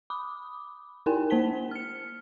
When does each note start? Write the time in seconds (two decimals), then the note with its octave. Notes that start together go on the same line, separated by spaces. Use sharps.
0.10 B5 D6 D#6
1.06 D#4 E4 A#4 G5 G#5
1.30 A#3 C5 A5 B6 G7
1.71 F6 C#7